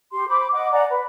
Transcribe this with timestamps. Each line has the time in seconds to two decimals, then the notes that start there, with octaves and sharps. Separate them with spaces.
0.12 G4 C6
0.28 C5 B5 D6
0.53 D#5 F#5 D6
0.72 D5 F#5 G#5 A#5
0.89 B4